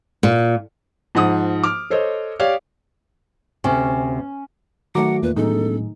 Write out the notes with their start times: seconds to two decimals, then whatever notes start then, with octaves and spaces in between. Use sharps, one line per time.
0.23 A#2
1.15 G#2 F3 F#5 D#6
1.63 D6 F6
1.90 A4 C5 C#5 D#5
2.40 G4 C#5 D5 F5
3.64 D2 C3 C#4
4.95 D#3 F#3 A3 F#5 A#5 D6
5.23 E2 A#2 B4
5.37 E1 A2 F#3 D#4 G#4 A4